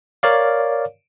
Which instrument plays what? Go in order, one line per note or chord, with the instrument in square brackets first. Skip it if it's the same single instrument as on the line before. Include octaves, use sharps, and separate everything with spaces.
[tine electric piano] A#4 C#5 D5 F5